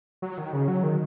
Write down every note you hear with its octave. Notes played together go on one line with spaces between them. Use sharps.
F#3
D#3
C#3
F#3
D#3